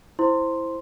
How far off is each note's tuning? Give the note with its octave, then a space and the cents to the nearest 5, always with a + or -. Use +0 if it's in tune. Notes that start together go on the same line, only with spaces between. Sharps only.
E4 +0 C5 +5 C6 +0